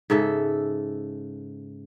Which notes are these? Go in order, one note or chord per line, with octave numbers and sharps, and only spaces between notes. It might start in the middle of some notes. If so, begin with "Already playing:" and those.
G#2 C#3 A4 E5